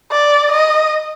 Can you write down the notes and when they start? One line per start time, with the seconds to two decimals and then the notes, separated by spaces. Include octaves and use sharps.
0.12 D5
0.52 D#5